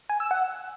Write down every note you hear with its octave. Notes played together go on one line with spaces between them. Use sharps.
G#5
E6
F#5